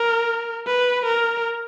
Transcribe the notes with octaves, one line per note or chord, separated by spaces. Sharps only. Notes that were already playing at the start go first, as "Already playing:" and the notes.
Already playing: A#4
B4
A#4